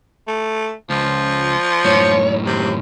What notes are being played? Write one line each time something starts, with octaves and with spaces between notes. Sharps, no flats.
A3
C#2 F3
F#2 A2 C#5
D#2 C3